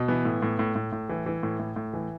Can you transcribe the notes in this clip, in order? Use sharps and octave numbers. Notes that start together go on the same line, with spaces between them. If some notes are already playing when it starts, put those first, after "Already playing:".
Already playing: B2
E3 B3
A2
A2
A2
A2
A2
E3
E3
A2
A2
A2
E3